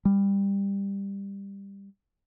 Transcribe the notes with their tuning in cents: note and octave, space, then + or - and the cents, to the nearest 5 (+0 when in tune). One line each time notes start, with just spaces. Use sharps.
G3 +15